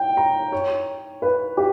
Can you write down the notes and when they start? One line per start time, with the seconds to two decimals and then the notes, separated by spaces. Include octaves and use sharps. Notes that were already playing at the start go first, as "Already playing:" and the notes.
Already playing: G5
0.17 A#5
0.52 C#5
1.22 B4
1.57 G4